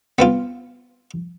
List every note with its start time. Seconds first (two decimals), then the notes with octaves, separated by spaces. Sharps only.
0.19 B3 C4 F4